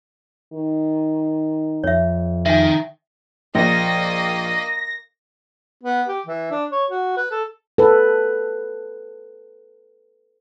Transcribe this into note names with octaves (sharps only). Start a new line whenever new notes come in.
D#3
F2 C#5 E5
D#3 E5 G#5
A#1 A#3 D#5 A#6
B3
G4
E3
D4
C#5
F#4
B4
A4
A4 B4